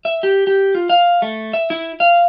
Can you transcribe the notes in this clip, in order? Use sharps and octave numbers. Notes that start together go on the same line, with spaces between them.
E5
G4
G4
F4
F5
A3
E5
E4
F5